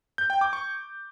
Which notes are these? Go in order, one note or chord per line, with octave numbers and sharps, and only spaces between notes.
G6
G5
D6
C#6